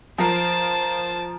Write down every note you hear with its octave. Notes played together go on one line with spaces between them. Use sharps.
F3 A#4 C5 A5 C7